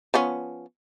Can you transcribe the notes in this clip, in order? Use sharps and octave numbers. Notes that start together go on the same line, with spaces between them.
F3 B3 C#4